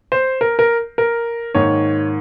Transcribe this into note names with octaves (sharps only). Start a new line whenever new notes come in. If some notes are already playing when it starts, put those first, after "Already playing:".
C5
A#4
A#4
A#4
G#2 D#3 A#3 C#5